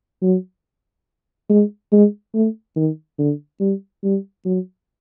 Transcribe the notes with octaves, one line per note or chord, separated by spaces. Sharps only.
F#3
G#3
G#3
A3
D#3
D3
G3
G3
F#3